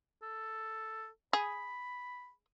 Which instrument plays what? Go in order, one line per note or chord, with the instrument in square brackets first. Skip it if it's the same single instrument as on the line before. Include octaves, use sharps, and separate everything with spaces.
[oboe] A4
[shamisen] G#4 [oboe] B5